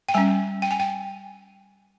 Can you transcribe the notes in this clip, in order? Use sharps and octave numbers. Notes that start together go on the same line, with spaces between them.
G5
G3 C#4 G#5
G5
G#5
G5